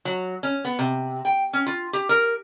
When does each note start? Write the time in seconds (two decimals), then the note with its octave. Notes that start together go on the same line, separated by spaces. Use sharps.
0.05 F#3
0.43 C#4
0.65 B3
0.79 C3
1.25 G5
1.53 C#4
1.66 F4
1.93 G4
2.09 A#4